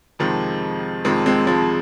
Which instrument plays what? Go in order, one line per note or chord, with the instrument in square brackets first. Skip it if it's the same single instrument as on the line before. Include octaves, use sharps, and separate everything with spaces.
[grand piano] F2 C3 D#3 F3 G#3
F2 C3 D#3 F3 G#3
G#3 C4
F3 G#3